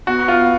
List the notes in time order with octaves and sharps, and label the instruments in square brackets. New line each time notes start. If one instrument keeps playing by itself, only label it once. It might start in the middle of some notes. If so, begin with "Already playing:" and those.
[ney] B3 [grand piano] F#4
[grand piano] F4